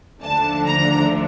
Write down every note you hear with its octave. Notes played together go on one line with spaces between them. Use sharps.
D#2 D3 F3 A3 D4 A5
A#5